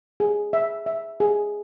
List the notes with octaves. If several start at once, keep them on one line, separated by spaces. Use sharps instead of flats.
G#4
E5
E5
G#4